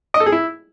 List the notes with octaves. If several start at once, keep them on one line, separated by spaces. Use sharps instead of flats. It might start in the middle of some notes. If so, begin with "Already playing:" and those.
D#5
A4
G#4
E4